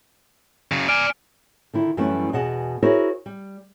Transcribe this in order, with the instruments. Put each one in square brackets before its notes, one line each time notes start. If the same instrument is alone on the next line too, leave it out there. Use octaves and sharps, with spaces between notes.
[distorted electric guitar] C#3 F#3
[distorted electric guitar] D5 G#5 [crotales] F6 D7
[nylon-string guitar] D3 D#3 E4
F#2 E3 G3 A3 B3 C#4
E2 B2 G#4 D#5 F#5 A5
E4 F#4 G#4 A#4 C5 C#5
G3